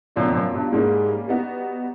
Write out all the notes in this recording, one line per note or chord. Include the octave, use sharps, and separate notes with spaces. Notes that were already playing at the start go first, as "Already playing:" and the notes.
F#2 B2 F#3 A3 D4 F4
F2
F#2
G2
G#2 G3 A#3 C#4
G3 B3 D#4 F#4